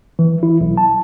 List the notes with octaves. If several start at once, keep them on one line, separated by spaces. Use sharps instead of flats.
E3
E4
B1
A5